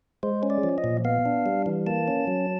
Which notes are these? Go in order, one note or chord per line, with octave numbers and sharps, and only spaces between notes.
G#3 C5
C#4
D5
F3
D#5
A#2
B3 F5
D4
G3
E3
A#3 A5
C#4
F#3